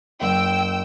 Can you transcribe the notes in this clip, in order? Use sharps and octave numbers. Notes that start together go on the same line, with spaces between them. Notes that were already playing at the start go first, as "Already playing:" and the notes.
F#1 G5 E6